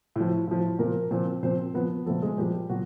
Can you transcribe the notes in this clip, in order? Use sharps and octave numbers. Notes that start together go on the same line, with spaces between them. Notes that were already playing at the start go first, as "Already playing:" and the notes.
A2 F3
A2 F3
A#2 F3 A#3 A#4
A#2 F3 C4 C5
A#2 F3 C4 C5
A#2 F3 B3 B4
A#2 F3 A3 A4
G#3 G#4
A#2 F3 G3 G4
A#2 F#3 F#4